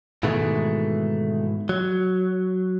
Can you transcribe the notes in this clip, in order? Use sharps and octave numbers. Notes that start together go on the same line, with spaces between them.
G#2 B2 D#3 E3 G#3 A3
F#3